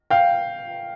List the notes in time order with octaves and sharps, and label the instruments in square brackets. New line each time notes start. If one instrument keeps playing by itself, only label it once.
[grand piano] F5 G5